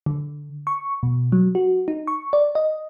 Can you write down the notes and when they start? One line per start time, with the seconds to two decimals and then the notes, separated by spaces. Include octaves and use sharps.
0.06 D3
0.67 C#6
1.03 B2
1.32 F#3
1.55 F#4
1.88 D#4
2.07 C#6
2.33 D5
2.55 D#5